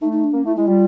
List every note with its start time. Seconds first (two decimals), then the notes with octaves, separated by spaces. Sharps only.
0.01 A3 D#4
0.12 D#4
0.24 D4
0.34 A#3 C#4
0.46 A3 E4
0.56 G#3 E4
0.68 G3 F4